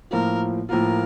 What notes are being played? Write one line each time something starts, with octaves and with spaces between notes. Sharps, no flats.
A2 F3 A#3 F4 A#4
A2 F3 A#3 F4 A#4